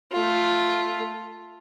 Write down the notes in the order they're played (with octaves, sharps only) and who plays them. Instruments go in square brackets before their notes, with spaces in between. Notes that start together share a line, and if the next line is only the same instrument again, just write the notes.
[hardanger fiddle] A3 F4